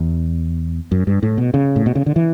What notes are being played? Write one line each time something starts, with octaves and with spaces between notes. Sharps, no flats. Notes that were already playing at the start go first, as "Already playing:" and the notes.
Already playing: E2
F#2
G2
A2
B2
C#3
A2
B2
C#3
D3
E3